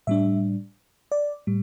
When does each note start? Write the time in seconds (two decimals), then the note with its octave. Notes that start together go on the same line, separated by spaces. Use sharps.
0.07 A2 G3 D4 E5
1.12 D5
1.47 A2 G3